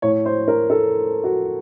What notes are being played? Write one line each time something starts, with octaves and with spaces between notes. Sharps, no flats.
A2 C#5
C5
A#4
A4
F#4